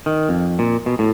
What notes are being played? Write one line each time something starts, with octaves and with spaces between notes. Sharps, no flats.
D#3
F2
A#2
B2
A2